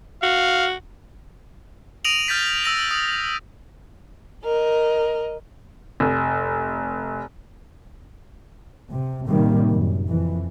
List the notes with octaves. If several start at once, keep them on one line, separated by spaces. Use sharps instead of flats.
F#4 F5
D#6 A#6 D7 D#7 F7 F#7
F6 G6 A6 B6
E6 A#6 D#7
D#6
A#4 D#5
F1
C3
A2 C3 D#3 G3 A#3
F#2
F2 E3